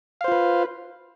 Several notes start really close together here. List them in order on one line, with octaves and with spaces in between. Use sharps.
F5 C5 F4 B4